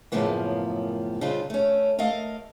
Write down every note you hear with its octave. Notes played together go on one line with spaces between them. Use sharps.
F#2 A2 C#3 F3 A#3 B3
C#3 G3 C4 D4 D#4 F4
A3 C#4
A3 A#4 D#5 F5